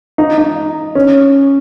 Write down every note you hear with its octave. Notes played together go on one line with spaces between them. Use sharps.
D#4
D#4
C#4